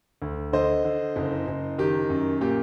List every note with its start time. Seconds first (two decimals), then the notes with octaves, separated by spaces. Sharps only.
0.22 D2
0.53 D3 C5 D#5
0.84 D3
1.16 F#1
1.48 F#1
1.78 D#3 G4
2.10 F#2
2.41 A#2 G4